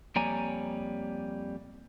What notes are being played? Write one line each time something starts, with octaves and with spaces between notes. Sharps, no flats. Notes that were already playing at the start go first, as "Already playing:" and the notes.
F2 G3 A#3 C#5 G#5 A#5